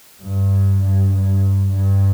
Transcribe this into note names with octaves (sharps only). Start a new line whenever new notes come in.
G2
G2
G2
G2